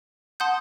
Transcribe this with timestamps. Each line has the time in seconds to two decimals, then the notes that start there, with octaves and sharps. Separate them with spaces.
0.40 F#5 A5 C6 D#6 G6